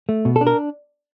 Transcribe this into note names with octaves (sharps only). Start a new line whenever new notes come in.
A3
B2
A4
D4
A#4